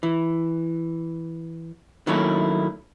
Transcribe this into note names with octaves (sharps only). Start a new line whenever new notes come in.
E3
D#3 F#3 A3 A#3 C#4 E4